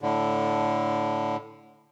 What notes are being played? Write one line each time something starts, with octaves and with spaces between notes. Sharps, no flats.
A2 D3